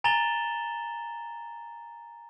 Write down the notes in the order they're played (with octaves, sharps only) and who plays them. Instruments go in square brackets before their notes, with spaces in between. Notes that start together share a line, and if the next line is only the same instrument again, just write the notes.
[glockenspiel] G#5 A#5 A6 E7 F7 G7